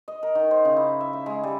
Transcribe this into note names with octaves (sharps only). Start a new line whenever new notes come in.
D#5
A#4
D#3
C5
C#3
E4
E5
E5
G#3
G3